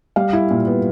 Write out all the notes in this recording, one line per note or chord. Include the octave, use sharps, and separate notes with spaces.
G3 F5
E4
A#2
B3